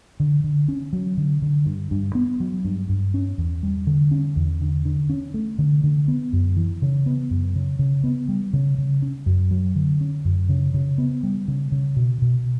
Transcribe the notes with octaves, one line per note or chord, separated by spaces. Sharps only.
D3
D3
C#4
F#3
D3
D3
G2
G2
B3
F#3
G2
G2
C#4
E2
G3
D3
C#4
E2
D3
D3
C#4
A3
D3
D3
B3
F#2
E3
C#3
B3
F#2
C#3
C#3
B3
G3
C#3
C#3
C#4
F#2
F#3
D3
C#4
F#2
C#3
C#3
B3
G3
C#3
C#3
B2
B2